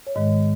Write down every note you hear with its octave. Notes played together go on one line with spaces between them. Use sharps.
C#5
G#2 D#3 G#3 D#5